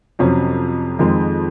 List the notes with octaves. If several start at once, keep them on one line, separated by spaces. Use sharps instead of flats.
F2 C3 F#3 C#4
F2 D#3 G#3 C4